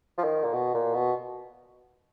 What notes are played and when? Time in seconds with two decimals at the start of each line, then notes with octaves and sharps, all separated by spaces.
0.18 F3
0.24 D#3
0.44 A#2
0.53 B2
0.74 A#2
0.94 B2